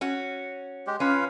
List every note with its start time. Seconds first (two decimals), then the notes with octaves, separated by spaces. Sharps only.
0.01 C#4 F#4
0.87 G#3 G4
1.00 C#4 F4 B4 F5